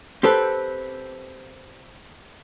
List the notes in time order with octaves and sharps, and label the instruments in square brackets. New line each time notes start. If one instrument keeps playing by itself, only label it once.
[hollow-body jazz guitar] C4 G4 A4 B4